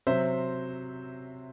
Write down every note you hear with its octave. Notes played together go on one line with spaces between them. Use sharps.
C3 F#3 C5 E5